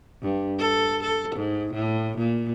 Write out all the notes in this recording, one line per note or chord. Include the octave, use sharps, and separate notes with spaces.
G2
A4
A4
G#2
A2
A#2